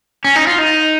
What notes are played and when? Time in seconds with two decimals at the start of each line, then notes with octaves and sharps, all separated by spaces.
0.24 C#4
0.36 D#4
0.47 F4
0.58 D#4